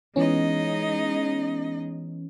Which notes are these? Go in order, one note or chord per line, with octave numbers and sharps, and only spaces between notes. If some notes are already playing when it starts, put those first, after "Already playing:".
E3 G#3 B3 C#4 D#4 D#5